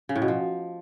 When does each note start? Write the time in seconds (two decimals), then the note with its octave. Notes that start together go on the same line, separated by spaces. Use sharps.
0.09 C#3
0.15 A2
0.22 B2
0.28 F3